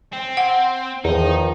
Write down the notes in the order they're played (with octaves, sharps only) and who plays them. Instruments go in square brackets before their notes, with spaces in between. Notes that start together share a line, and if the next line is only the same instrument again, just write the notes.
[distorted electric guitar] C4
[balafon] F#5
[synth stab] E2 [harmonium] D#3 F3 [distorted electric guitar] D#4